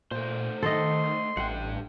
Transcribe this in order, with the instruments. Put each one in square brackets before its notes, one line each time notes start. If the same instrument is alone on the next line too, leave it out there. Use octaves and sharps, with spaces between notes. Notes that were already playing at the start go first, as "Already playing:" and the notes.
[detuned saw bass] A#2 [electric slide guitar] A3 C5
[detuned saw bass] D#3 [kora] A4 D#5 [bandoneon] C6
[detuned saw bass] A1 [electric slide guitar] G2 G5 [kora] F#5